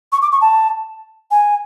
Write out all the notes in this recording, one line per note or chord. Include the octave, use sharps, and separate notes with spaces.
C#6
D6
C#6
A5
G#5